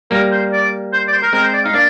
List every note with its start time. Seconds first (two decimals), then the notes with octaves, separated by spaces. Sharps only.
0.11 G3 A#3 A#4
0.32 C5
0.52 D5
0.93 C5
1.07 D5
1.13 C5
1.23 A#4
1.33 G#3 C4 A#4
1.43 C5
1.53 D5
1.64 D#4 F5
1.74 A#3 D4 D5